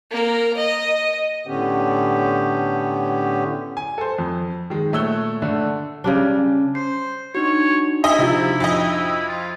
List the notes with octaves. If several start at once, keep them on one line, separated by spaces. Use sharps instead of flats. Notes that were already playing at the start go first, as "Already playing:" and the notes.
A#3 A#4
D#5
A2 D3 B3 C#4 G4
G#5
A4 C5
F2
D#3 G#3
A#2 A3 C#5 E6 F#6 G7
D3 A3
C#3 G3 D4
C5 C7
D4 D#4 F#4 C#5
E4 D#5 E5
C3 F3
F2 D#5
F4